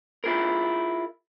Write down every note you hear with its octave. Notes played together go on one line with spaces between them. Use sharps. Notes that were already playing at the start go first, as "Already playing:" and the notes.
E4 F4 G#4 A#4